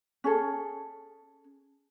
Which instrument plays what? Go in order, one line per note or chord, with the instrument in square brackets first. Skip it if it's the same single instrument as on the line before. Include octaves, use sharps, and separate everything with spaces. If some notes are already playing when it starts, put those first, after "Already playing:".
[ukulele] C#4 G#4 A4